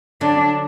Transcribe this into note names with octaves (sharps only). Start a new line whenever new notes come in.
D3 F#3 D4